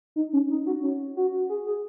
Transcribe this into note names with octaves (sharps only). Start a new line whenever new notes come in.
D#4
C#4
D#4
F#4
C#4
F#4
G#4
G#4